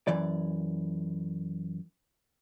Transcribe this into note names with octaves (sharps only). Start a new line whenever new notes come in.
F#2 E3 D5